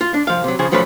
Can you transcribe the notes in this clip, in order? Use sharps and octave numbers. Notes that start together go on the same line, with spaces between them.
F4
D4
C2 F3 F5
C3 F#3
C#3 F3 G#4
B1 F3 F#3 A3 C#4 B4